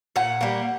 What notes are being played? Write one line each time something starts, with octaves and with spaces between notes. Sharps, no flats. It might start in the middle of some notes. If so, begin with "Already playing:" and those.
A#2 F#5
G3 A#3